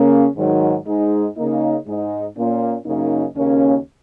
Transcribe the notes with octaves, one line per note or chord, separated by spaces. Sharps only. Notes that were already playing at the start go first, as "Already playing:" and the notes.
Already playing: C#3 A#3 C#4
G#2 D#3 F#3
G#2 G#3 D#4
C#3 A#3 D#4
G#2 G#3 D#4
A#2 A#3 C#4
F#2 C#3 A#3 D#4
D#2 C#3 A#3 C#4